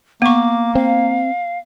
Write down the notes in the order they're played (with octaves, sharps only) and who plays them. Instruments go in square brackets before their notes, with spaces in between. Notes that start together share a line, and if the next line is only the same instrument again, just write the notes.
[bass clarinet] A#3 [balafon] B3 C#6 [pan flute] D6
[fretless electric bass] C4 [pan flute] F5